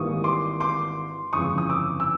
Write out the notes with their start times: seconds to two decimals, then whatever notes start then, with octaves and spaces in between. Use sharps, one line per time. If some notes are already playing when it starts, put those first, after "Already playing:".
Already playing: G#1 G#2 E3 G3 A#3 C#6 D#6
0.24 C6 D6
0.60 C6 D6
1.33 G1 F2 C#3 E3 G#3 C#6 D#6
1.58 D#6
1.70 D6 E6
2.00 E6